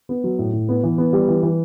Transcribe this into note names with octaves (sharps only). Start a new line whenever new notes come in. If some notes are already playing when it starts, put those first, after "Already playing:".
B3
F#3
A2
A2
B3
E3
B3
G3
E3
E3